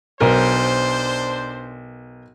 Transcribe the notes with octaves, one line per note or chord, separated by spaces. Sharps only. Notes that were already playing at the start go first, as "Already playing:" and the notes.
B1 D4 A#4 C5